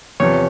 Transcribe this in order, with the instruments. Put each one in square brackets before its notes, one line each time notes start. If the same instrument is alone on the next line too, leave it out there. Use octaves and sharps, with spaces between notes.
[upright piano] E2 C3 F3 [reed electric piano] C#5